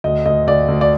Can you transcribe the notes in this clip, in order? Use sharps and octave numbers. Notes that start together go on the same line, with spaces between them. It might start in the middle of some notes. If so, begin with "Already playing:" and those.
D2 D#5
D2 D#5
D2 D5
D2
D5